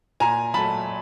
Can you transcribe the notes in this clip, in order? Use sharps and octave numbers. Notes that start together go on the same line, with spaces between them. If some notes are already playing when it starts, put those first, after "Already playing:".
A#2 G#5 A#5
F#3 A3 A5 B5